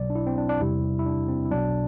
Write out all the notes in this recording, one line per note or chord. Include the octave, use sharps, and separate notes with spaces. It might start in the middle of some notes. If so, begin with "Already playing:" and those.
Already playing: B1 B2 F#3 D5
D4
E4
C4
D4
D4
E2 C3 G3 E4
E4
D4
C4
E4
B1 B2 F#3 D4